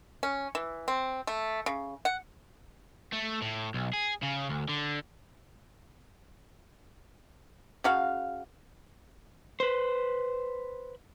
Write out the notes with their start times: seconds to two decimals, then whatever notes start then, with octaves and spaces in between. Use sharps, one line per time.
0.23 C#4
0.55 E3
0.88 C4
1.27 A3
1.66 C#3
2.05 F#5
3.12 A3
3.42 A2
3.74 B1
3.93 G#4
4.23 C#3
4.49 D2
4.69 D3
7.84 C#3 F#4 F5
9.60 B4 C5